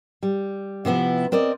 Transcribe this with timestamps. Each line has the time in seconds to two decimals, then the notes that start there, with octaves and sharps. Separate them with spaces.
0.23 G3
0.85 C3 F3 B3 E4
1.32 C4 A#4 D5 D#5